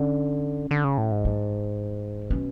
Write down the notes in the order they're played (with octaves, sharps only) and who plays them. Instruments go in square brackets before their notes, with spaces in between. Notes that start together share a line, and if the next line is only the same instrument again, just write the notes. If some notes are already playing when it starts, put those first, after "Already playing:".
Already playing: [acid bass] D3 [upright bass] C#4
[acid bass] D3
C#3
A2
G#2
[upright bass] D4
[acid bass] B2 [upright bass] C#4